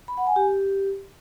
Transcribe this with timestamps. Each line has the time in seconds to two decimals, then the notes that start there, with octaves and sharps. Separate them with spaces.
0.08 B5
0.17 F#5
0.27 G#5
0.36 G4